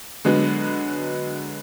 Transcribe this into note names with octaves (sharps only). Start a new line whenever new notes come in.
D3 F#3 G#3 B3